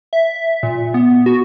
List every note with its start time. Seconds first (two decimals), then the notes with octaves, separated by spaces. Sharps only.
0.13 E5
0.63 A#2
0.94 B3
1.26 F#4